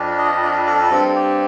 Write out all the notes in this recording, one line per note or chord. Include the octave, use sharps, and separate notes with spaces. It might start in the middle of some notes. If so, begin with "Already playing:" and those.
Already playing: F2 D4
D#5
D4
A4
G2 C4
G4